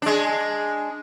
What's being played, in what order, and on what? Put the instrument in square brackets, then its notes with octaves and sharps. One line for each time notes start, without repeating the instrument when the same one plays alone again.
[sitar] G#3 D4